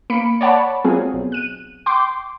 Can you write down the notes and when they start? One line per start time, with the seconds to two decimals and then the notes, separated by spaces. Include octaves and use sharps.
0.10 A#3 B5 C#7 D7
0.41 C#5 D5 F#5 A5 B5
0.85 F#3 C4 F4 G#4
1.14 B1
1.32 F#6 D#7
1.86 G5 C6 D6